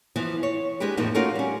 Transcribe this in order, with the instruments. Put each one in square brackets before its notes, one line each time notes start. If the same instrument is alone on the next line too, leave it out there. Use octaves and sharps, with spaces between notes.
[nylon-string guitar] E3 F3 B3
C#5
G#3 D4 G4 B4
F2 A2 E3 F3 A#3 D#4
A3 C#4 D#4 F4 F#4 A#4
G3 C#4